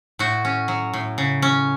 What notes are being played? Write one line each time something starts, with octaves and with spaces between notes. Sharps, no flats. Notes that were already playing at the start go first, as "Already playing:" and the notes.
A2 F#4
C#4
F#3
A2
C#3
C#4